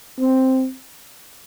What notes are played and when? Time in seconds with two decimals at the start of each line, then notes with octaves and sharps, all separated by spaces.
0.19 C4